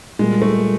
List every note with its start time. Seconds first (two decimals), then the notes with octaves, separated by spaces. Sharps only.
0.19 A#2 G3 G#3 A#3
0.42 A3